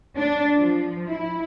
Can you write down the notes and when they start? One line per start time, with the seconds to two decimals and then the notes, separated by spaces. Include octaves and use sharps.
0.18 D4
0.57 F3
1.08 E4